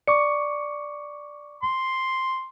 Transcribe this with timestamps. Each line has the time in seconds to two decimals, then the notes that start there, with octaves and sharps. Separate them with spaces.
0.07 D5 C#6 D6 C#7
1.63 C6